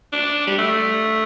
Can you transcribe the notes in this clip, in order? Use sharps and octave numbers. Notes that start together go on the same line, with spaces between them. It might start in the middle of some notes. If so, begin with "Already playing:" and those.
D4
G3
A3